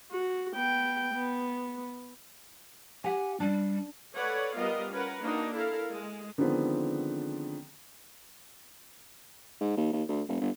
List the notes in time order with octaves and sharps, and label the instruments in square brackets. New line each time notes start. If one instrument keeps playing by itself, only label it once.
[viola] F#4
B3 G5
B3
[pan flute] G4 [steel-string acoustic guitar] F#5 G#5
[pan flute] G3 [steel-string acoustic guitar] D4
[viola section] A4 B4 C#5 D5 F#5
G3 B3 F4 A#4 D#5 F5
C#4 A#4 B4 F#5
A#3 D4 D#4 F#4
E4 A4 A#4 F5
G#3
[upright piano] D3 D#3 F3 G#3 B3 C4
[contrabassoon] G#2
D#2
D#2
D2
F1
G1